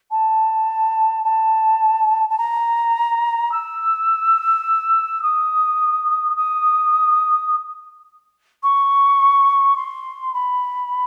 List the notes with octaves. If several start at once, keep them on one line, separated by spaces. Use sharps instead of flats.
A5
A5
A5
A#5
E6
D#6
D#6
C#6
C6
B5